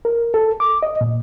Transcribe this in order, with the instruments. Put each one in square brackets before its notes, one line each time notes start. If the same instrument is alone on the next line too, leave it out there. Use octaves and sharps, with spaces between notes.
[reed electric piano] A#4
A4
D6
D#5
A#2